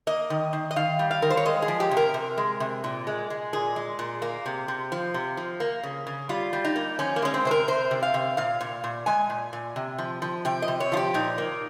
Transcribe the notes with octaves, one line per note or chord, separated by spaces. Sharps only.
A#3 D#5
D#3
D#3
D#5
D#3 F5
G3
F5
D#3 A#4
C5
C#5
G#3 D#5
G#4
F3
G4
C3
A#4
C3
G#3
C3
A#2
G#3
G#3
A#2 G#4
G#3
A#2
A#3
C3
C3
F3
C3
F3
A#3
C#3
C#3
G3 F4
G3
D#4
A#3
F3 C#4
A#3
G#3 C#4
C4
C3 C5
A#4
C3 C5
C3
F5
C3
A#2 F5
A#2
A#2
G#3 G#5
A#2
A#2
C3
F3
F3
C3 G5
D#5
C3
C#5
F3 F4 G4
A#2 D#4
A#3